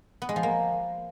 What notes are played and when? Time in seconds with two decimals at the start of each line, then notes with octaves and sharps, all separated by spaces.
0.22 B3
0.29 G#3
0.36 F3
0.43 A#3